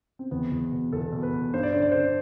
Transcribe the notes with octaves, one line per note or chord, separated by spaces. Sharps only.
C4
E2 B3
E2
B2
E2 A4
B2
B4
B2
G2 C5
D5
D3 C5
D5
D3 C5